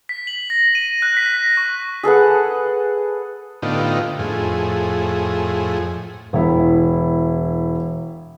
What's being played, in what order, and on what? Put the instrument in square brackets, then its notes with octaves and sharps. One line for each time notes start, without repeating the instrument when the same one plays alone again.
[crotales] B6
F#7
A#6
D#7
F#6
B6
A#6
C#6
[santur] G#4 A4 B4 F#5
[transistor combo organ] A2 D3 B3 D#4 F4 G4
F2 A2 G#4
[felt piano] E1 E4